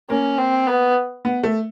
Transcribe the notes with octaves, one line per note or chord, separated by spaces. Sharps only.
A#3 C#4
C4
B3
B3
A3